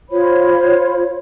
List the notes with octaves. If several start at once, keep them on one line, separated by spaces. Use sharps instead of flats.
F4 C5 C#5 B5